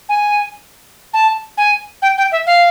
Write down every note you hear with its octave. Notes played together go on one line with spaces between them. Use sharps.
G#5
A5
G#5
G5
G5
E5
F5